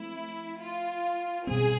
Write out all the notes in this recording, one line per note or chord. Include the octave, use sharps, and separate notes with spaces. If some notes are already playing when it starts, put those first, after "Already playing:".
Already playing: F3 A3 C4 E4
F4
B2 G3 C4 G#4